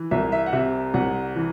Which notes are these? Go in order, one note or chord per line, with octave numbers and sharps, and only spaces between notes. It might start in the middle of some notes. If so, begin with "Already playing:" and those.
Already playing: E3
C2 E5
E5
F#5
C3 E5
C2 F#5
E3